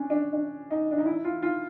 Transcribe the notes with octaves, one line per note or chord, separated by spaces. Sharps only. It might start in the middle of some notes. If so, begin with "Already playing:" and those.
Already playing: C#4 D4
D4
D4
D#4
D4
D#4
E4
F4
F4